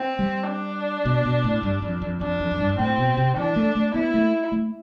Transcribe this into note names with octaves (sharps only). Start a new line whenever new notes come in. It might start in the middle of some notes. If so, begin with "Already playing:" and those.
Already playing: C4
G3
D4
B2
B2
A2
G2
F2
F2
F2 D4
F2
F2
G2
A2 C4
B2
C3
E3 D4
A3
A3
B3 E4
A3
A3